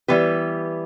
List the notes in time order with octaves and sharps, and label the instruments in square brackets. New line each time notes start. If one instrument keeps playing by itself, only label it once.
[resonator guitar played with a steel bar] E3 G3 B3 G4 B4